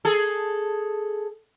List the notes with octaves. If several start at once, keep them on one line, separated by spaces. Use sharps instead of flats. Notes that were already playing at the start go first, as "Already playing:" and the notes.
G#4 A4